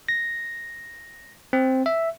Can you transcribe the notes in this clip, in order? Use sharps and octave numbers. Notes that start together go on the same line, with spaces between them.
A#6
C4
E5